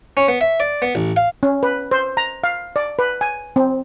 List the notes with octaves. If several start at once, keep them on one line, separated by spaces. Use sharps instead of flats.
C#4
B3
E5
D5
B3
A1
F5
C#4
B4
C5
A#5
F5
D5
B4
G#5
C4